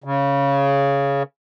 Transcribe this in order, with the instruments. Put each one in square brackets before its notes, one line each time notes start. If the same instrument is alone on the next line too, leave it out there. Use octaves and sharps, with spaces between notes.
[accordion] C#3